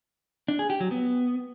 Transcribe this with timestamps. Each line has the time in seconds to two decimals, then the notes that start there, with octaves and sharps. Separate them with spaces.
0.48 D4
0.59 G#4
0.70 G4
0.80 F#3
0.91 B3